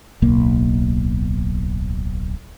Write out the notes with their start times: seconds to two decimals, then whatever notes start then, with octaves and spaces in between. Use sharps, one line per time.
0.22 D1 B1 A#3